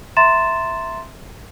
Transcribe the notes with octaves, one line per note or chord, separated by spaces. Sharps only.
E5 A#5 C6 A6 E7